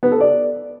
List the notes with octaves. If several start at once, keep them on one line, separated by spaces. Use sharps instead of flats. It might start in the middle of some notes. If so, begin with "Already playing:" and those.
B3
A4
D5